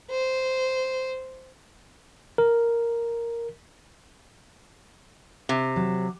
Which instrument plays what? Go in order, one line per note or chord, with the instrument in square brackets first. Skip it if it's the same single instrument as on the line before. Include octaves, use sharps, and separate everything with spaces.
[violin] C5
[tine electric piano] A#4
[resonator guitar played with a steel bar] C3
[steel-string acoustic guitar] F#3